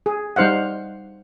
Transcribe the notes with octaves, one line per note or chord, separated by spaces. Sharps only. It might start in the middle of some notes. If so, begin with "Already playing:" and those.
G#4
G3 D#4 C5 F5 F#5